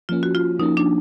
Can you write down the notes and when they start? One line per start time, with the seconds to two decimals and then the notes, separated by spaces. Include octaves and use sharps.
0.09 F3 A#3 C#4 F4
0.23 F#4
0.35 F4
0.59 F3 A#3 C#4 D#4
0.77 D4